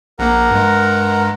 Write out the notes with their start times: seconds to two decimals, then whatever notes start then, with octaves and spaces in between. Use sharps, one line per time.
0.19 A#1 A#3 A#4 F#5 A#5
0.51 G2 G#3